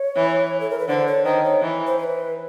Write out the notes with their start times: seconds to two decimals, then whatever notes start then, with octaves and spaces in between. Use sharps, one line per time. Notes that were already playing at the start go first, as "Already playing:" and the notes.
Already playing: C#5
0.16 E3
0.61 A4
0.70 A#4
0.79 B4
0.89 D3 C5
1.07 C#5
1.25 D#3 C5
1.44 C#5
1.62 E3
1.87 C5
1.99 C5
2.04 B4